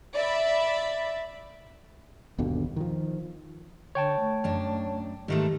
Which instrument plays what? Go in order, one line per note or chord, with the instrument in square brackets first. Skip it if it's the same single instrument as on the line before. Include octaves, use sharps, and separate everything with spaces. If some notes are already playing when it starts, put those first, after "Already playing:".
[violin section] D5 E5 B5
[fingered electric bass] G1 D#2 B2 D3
D#3 F3
[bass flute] D3 [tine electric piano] C#5 G5 A5
[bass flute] A3
[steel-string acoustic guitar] F#2 D4
[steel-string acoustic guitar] G#2 D#3 A3 [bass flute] G4